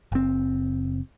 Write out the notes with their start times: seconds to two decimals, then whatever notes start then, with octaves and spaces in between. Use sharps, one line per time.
0.12 F#1 C4